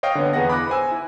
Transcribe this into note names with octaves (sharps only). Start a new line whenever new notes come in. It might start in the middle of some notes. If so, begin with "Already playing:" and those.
C#5 D#5 F5 G5
D3 B3
E2 B3 G#4 D#5 F#5 A#6
B5 D6 F#6 A#6
C5 G#5 E6
E4